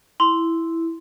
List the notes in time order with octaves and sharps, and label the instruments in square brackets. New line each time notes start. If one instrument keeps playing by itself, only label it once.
[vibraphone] E4 [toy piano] C6